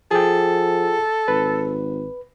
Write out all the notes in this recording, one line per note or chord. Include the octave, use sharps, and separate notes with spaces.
F3 G#4 A4 G5
G#1 B4